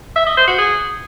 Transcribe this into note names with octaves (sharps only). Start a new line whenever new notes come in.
E5
D#5
C5
F#4
G#4